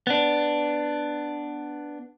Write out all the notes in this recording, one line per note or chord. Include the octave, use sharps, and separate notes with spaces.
B3 D4